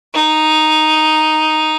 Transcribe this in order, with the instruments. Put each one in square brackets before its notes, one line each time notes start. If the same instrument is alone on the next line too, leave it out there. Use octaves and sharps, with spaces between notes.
[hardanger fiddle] D#4